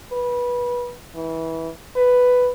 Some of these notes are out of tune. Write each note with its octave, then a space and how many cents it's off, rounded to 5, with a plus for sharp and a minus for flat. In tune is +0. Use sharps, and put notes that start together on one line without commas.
B4 -20
E3 -20
B4 +5